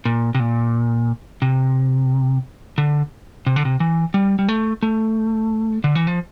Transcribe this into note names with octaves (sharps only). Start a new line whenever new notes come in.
A#2
C3
A#2
C3
D3
C3
D3
C3
E3
G3
G3
A3
A3
D3
E3
F3